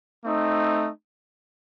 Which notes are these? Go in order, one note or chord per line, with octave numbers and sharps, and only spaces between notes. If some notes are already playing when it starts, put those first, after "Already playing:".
A3 C4 D#4